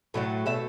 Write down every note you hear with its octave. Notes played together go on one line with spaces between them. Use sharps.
A2 F#3 A3
B2 A3 E5